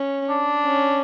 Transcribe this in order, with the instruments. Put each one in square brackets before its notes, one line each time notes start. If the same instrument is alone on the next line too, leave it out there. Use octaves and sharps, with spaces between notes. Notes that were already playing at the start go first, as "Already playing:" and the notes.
Already playing: [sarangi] C#4
[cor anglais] D4
[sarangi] C#4